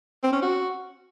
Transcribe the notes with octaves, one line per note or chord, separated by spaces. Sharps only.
C4
C#4
F#4